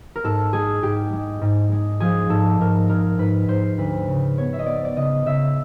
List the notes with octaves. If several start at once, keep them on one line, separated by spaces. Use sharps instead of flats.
A#4
G#2 A4
G#3 G#4
G#2 G4
G#3
G#2
G#3
F3 G#4
G#2 A4
G#2 A#4
G#3 A#4
G#2 B4
G#2 C5
D2 B4
C#3
B3 C#5
E5
D#5
B3 D5
D5
C#3 D#5
C#3 E5